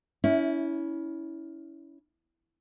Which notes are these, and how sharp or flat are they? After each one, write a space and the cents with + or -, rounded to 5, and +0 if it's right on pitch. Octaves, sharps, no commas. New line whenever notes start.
C#4 +25 E4 -15